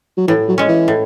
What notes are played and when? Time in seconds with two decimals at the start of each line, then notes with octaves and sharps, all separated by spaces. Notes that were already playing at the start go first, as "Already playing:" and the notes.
0.17 F#3
0.28 A2 E3
0.48 F#3
0.58 G#3 C#4
0.68 E3
0.88 A2